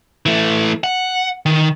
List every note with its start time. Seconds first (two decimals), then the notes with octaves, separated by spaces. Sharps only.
0.26 E3 A3
0.84 F#5
1.46 D#3